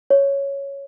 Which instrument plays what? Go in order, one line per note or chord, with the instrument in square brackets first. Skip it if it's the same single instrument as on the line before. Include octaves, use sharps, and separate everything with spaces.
[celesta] C#5